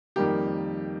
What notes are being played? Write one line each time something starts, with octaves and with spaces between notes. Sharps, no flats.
F2 D#3 G3 A#3 G4